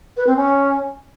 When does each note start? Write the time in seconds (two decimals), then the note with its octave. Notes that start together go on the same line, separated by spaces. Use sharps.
0.17 B4
0.27 C4
0.36 C#4